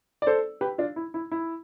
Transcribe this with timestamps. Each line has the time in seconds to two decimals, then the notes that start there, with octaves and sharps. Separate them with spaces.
0.22 D5
0.27 A4 C5
0.61 G4 B4
0.78 D4 F4
0.96 E4
1.14 E4
1.31 E4